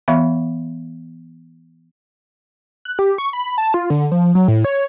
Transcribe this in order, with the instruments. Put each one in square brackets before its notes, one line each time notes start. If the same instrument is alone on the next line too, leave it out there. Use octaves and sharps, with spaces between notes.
[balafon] E3 B3 E5 F5 B5
[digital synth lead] F#6
G4
C#6
B5
A5
F4
D3
F3
F#3
A2
C#5